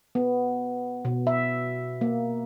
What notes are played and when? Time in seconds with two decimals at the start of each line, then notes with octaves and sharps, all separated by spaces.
0.15 B3
1.05 B2
1.27 E5
2.01 A#3